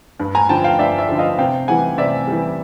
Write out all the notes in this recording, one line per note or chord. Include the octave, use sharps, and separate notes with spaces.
G2
G#5 A#5
D3 F3 G5 A5
F5 G5
G2 D5 E5
D5 E5
D3 F3
D#5 F5
C3 F5 G5
E3 G3 F#5 G#5
C3 D5 E5
E3 G3